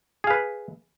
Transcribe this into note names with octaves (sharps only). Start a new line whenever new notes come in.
G#4 B4 F5